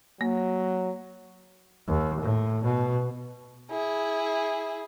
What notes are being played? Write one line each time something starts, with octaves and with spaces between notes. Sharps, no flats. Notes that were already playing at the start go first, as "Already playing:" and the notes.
F#3 A#3
D#2
A2
B2
E4 G#4